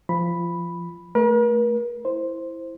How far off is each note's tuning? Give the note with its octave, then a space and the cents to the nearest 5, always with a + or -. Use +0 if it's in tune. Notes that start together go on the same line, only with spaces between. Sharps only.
F3 -20 B5 +0
A3 +0 A#4 +45
E4 +0 C5 +0